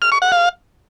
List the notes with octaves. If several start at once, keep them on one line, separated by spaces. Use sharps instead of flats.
F6
C#6
F#5
F5